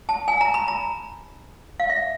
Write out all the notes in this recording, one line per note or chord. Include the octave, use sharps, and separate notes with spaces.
A5
G#5
A#5
B5
A#5
F5
E5